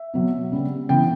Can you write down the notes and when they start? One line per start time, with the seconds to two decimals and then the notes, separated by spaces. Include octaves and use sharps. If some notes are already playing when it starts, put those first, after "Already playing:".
Already playing: E5
0.14 B2 F#3 B3
0.52 C#3 G3 B3
0.89 C#3 E3 B3 G5